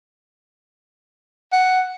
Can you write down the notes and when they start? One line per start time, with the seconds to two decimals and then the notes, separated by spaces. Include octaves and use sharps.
1.52 F#5